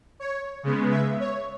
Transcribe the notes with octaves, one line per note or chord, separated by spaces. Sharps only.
C#5
C#3 G#3 B3
E5
C#5